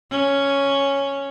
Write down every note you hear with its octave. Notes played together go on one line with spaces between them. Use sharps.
C#4